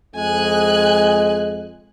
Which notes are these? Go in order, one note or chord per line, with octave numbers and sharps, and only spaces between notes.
F2 G#3 G#5 F#6